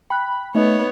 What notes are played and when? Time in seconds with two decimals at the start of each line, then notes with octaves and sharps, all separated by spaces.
0.10 G5 B5 F#6
0.55 A3 B3 D#4 C#5 D#5